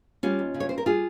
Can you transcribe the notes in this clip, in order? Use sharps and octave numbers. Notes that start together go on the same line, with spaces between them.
G3 C#4 F4
D#2
C#3
C#5
C4 C5
A#4
G3 F4 G#4